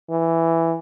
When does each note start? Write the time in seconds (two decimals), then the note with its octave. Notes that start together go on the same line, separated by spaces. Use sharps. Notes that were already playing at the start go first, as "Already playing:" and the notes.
0.10 E3